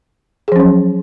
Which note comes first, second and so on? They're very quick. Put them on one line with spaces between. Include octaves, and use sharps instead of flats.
G#4 F3 C#4 F#3